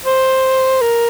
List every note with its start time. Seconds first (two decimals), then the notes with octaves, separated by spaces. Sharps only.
0.05 C5
0.81 A#4